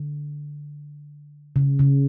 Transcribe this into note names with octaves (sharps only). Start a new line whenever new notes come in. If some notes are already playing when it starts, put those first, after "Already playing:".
Already playing: D3
C#3
C#3